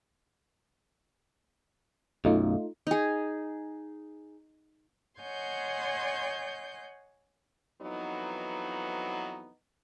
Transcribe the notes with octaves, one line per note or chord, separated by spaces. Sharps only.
B1 F#2 A3 D#4 F4
D#4 G#4
C#5 D#5 F#5 G#5 C6 G6
F2 E3 F#3 B3 D#4